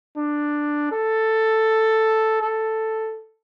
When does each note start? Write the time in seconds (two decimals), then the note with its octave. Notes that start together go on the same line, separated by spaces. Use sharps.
0.17 D4
0.92 A4
2.41 A4